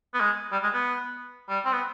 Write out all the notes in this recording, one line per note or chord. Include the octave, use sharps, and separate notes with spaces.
B3
G#3
G3
G#3
B3
G3
C4
B3